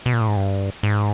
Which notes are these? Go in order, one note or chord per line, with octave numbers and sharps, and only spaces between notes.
B2
A#2
A2
G#2
G2
G#2